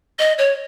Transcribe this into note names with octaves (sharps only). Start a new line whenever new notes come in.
D#5
C#5